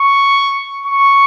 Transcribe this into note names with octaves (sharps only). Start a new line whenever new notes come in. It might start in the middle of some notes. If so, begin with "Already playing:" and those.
Already playing: C#6
C#6